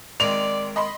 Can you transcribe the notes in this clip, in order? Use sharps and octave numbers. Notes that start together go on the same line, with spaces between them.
D#3 G#3 C4 D5 F7
D#5 B5 C6